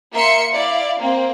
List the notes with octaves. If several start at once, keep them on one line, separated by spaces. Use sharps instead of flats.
A#3 E5 C6 C#7
E4 D5 F5
A#3 C4